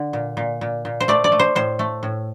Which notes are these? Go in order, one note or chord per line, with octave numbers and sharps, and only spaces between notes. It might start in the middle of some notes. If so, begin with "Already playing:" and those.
Already playing: D3
A#2
A#2
A#2
A#2
C5
A3 D5
D5
A3
C5
A2 C5
A3
A2